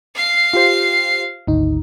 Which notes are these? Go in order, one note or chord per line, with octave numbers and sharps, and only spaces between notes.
F5 C7
F4 G4 C5
G#1 D2 D#4